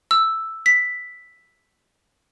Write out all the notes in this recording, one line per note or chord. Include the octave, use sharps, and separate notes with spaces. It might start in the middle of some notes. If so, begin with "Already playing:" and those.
E6
B6